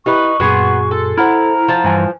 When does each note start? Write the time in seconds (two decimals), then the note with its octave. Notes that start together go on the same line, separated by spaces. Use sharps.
0.06 D#4 E4 G4 B4 C#6
0.40 F#2 A#2 B3 F#4 G#4 C6
0.91 A4
1.18 E4 C5 F#5 A#5 F6
1.68 F3 A5
1.84 G2 E3 G#5